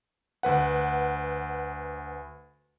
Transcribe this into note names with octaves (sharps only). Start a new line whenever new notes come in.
D2 B4 F#5